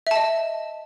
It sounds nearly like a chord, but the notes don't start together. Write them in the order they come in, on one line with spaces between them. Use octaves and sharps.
E5 A5 D#5